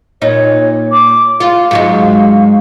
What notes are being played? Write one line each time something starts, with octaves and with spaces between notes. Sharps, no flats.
A#2 D#4 C#5
D6
F4 F5
G#2 F#3 G#3